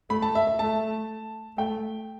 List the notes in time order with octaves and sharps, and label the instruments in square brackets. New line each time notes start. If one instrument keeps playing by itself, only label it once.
[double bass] A3 [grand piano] B5
[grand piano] A5
E5
E5
[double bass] A3 [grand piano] A5
[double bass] A3 [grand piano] G5